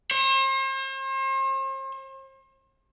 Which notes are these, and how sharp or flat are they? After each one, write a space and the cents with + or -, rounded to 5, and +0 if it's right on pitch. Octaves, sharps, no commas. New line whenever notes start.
C5 +40